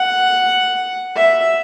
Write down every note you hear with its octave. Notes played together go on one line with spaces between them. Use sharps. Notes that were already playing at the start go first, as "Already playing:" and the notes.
Already playing: F#5
E5